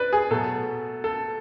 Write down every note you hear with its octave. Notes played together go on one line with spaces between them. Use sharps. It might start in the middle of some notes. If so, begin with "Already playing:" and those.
Already playing: B4 D5
G#4
B2 F#3 A3 A4
A4